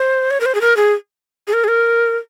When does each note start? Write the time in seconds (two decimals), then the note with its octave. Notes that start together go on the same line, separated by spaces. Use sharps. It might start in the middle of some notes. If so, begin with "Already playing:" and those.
Already playing: C5
0.31 C#5
0.40 A#4
0.46 C5
0.55 G#4
0.61 A#4
0.77 G#4
1.48 G#4
1.53 A#4
1.64 G#4
1.68 A#4